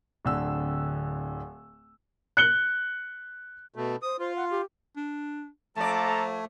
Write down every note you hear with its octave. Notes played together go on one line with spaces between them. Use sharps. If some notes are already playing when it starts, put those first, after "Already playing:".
D1 D3 E6
F#6 C#7 G7
B2 A3
C5 D#6
F4 C5
F#5
G4
D4
F2 A3 A#3 A4 D5 A5 A#5